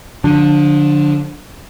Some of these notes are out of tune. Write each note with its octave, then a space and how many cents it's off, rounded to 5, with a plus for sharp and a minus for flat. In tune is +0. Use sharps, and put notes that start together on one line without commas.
D3 +0 F3 +25 D4 +0